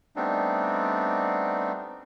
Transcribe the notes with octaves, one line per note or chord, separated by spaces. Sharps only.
G3 A3 B3 C4 D4 D#4